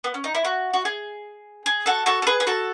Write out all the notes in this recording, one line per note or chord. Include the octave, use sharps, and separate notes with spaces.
B3
C#4
D#4
E4
F#4
F#4
G#4
G#4
F#4 A4
F#4 A4
A4
G#4 B4
G#4
F#4 A4